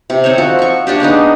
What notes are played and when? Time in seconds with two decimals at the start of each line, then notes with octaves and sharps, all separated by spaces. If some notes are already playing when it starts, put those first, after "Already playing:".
0.10 C3
0.24 C4 D#4 A4 C#5
0.38 F3 F#4 A4
0.59 F#4 C#6
0.87 A#3 D4 F#4 G4
1.00 G#3 B3 D4 D#4